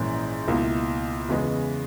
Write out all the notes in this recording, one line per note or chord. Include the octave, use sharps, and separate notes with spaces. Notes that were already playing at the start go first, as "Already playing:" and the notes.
Already playing: A#1 G#2 E3 A#3 C#4
C#2 B2 A#3 E4
E2 C#3 G#3 B3